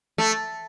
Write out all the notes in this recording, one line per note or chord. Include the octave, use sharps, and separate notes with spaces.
A3